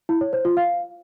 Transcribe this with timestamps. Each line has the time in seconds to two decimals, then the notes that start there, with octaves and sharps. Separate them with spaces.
0.09 E4
0.21 C#5
0.33 C5
0.45 F4
0.57 F5